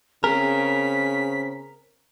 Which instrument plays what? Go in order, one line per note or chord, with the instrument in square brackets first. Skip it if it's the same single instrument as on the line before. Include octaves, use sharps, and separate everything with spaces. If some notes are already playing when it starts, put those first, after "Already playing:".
[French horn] C#3 [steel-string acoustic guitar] C4 G#4 C5 [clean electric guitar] A#4 [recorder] B6